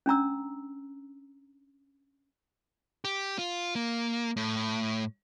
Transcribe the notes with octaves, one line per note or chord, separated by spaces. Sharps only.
C#4 D4 A#5 E6
G4
F4
A#3
A2